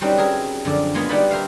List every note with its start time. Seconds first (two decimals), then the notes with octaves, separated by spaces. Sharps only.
0.01 G3 C4 C#4 D#4 F#4 B4
0.18 G#4 A#4 E5
0.65 F#2 D3 F3 D5
0.94 G#3 A#3 B3 F4 G#4
1.09 G3 B3 D#4 B4 D5 B5
1.31 A#4 C5 E5 F5